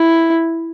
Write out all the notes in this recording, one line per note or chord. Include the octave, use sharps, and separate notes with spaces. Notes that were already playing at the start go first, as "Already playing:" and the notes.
Already playing: E4